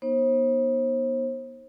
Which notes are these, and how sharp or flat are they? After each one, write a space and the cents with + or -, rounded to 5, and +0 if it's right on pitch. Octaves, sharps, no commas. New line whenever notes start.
B3 -35 D#4 +0 C5 +40